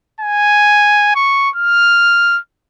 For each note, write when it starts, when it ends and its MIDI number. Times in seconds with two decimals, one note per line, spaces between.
0.21 1.11 80
1.15 1.50 85
1.56 2.39 89